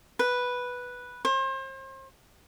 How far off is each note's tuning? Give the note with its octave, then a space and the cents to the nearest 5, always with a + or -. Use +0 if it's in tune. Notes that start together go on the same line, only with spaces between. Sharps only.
B4 -5
C5 +35